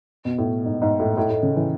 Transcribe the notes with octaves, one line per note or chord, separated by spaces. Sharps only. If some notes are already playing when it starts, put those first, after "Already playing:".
B2
A2
G#2
G#2
A2
A2
A2
C#3
E3